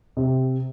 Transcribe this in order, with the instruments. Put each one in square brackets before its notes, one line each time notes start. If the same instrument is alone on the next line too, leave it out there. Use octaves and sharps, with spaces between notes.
[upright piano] C3